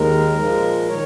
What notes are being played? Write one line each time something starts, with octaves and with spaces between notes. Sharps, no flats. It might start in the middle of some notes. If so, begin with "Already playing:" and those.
Already playing: D#2 D#3 G#3 A#4
A#2 F3 G#3
D#3 C#5